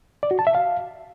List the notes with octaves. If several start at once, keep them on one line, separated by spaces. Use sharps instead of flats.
D5
F#4
A5
E5
F5